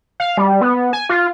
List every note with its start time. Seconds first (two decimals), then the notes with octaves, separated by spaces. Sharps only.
0.20 F5
0.37 G3
0.61 B3
0.93 G#5
1.09 F4